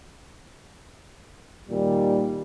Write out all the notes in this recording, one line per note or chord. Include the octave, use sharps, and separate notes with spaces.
A#2 D#3 G3